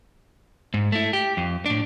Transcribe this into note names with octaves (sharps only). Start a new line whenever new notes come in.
G#2
A3 E4
G4
F2
A2 D4